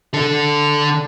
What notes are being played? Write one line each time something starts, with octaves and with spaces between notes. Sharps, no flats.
D3 A4